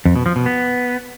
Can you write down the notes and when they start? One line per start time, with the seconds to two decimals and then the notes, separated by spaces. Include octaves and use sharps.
0.05 F2
0.16 B2
0.26 F3
0.36 B2
0.46 B3